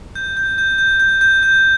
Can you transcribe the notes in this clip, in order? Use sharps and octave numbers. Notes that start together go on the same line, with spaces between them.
G6
G6
G6
G6
G6
G6
G6